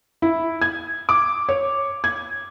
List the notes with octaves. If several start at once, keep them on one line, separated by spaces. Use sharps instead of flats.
E4
G#6
D6
C#5
G#6